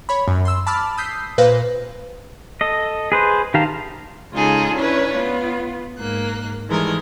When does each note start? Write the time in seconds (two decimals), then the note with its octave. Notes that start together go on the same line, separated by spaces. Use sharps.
0.09 C#5 B5
0.28 F#2
0.45 C6 E6
0.67 A5 B5 D6 E6 F6 A6
0.98 D#6 E6 G6 B6 C7
1.38 A#2 B4 C5 F5 A#6
2.61 A4 D#5
3.12 G#4 B4 C5
3.54 D#3 G4 F5 A5 A#5
4.32 C#3 G#3 D#4 F4 G#4 A4
4.76 C#4 D4 E4 A#4 B4 C#5
5.16 B3 F4
5.98 G#2 A#3 F#6
6.68 D#3 E3 G3 G#3 A4 A#4